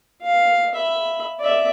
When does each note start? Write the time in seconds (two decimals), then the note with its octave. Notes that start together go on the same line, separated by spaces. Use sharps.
0.22 F5
0.75 E5 B5
1.40 D5 E5